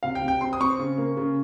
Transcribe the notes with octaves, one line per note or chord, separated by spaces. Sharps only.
C3 F5
G5
C3
G5
C4 C6
D#6
C4 C#6
C#3
A#3
C#3